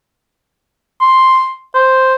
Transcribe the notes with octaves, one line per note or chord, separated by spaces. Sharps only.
C6
C5